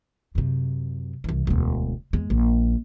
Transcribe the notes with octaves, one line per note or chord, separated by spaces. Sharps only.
F#2 C3
C2 E3
E1 D2
E2 G#3
A#1